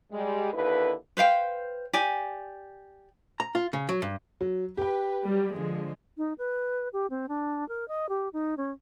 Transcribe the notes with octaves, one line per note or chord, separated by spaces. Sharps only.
G3 G#3
D#2 D3 E4 B4
B4 C5 F5 G5
G4 D5 G#5
A#5
F4
C#3
F#3
G2
F#3
G4 B4 G5
F#3 G3
D3 F3 G#3
D#4
B4
G4
C4
D4
A#4
D#5
G4
D#4
C#4